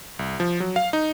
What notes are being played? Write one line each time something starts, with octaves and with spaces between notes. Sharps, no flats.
C2
F3
F#3
F5
D#4